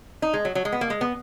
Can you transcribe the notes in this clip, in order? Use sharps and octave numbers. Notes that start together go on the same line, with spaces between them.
D#4
G#3
F#3
F#3
G#3
B3
A#3
G#3
B3